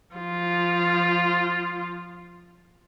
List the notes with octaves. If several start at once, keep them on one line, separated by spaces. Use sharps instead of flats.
F3 F4